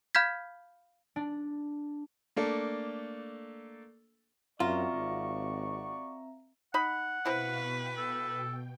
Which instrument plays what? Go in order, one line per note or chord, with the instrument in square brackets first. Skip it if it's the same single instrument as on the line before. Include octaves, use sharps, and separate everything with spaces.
[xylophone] F5 B5 F6 G6 G#6 B6
[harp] D4
[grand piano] A3 A#3 D4 A4
[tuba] F#2 [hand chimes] C4 E5 A#5 [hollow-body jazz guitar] F4 [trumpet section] F#4 D5 C#6
[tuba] G#1
[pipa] D#4 B5 [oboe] F#5
[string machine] B2 F5 C#6 [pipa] C4 E4 [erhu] B4
[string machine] B2 G5
[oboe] A4